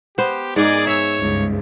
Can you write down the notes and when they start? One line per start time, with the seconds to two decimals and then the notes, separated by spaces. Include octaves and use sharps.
0.18 B3 G4 C5
0.56 G#2 G#4 A#4 D5 D#5
0.87 C#5 E5 E6
1.18 C#2 G2